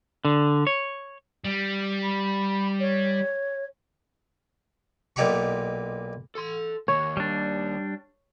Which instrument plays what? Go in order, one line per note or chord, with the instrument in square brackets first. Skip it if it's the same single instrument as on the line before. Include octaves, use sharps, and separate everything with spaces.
[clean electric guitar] D3
C#5
[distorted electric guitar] G3
[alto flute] B5
C#5
[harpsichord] B1 A#2 D#4 G4 B5 C#6
[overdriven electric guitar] A4 C6
[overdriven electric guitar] D#2 A#3 [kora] C#5
[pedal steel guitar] G3 D4